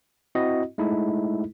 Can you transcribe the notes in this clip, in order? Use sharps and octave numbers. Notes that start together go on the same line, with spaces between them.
C4 E4 F#4 D#5
G#3 A3 D#4 E4 A4